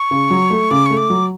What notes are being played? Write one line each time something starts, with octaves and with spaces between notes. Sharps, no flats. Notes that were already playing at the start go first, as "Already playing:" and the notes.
Already playing: C#6
C#3
F#3
A3
C#3 D6
A3 C#6
D6
F#3